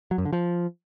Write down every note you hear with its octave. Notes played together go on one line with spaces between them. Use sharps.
F#3
F#2
D3
F3